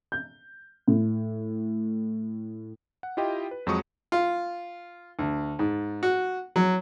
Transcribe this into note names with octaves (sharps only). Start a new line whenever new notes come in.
G6
A2
F#5
E4 F4 G4 D#5 G5
B4
F2 F#3 G#3 C#6 D#6
F4
D2
G#2
F#4
F#3